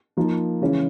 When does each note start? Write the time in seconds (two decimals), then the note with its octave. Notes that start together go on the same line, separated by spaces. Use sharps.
0.17 F3 A#3 D#4
0.62 C#3 E3 G#3 C#4